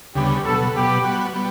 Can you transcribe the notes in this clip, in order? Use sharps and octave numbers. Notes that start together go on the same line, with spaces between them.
D2 C#3 G3 B3 G4
B2 F#3 B3 A4
B2 F#3 B3 G4
G3 B3 F#4
G3 B3